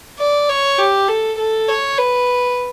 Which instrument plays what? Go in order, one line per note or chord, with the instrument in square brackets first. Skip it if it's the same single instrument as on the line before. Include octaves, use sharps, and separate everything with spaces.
[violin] D5
C#5
G4
A4
A4
C#5
B4